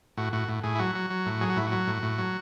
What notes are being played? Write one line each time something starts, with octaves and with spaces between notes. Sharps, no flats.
A2 F#4
A2 F#4
A2
A2 G#4
E4
F#3 F#4
F#3
F#3
A2
F#3 G#4
F#4
A2 E4
F#4
F#3
A2
A2
F#3